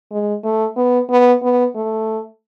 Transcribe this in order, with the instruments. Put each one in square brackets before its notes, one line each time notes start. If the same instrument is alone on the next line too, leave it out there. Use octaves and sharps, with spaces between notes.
[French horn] G#3
A3
B3
B3
B3
A3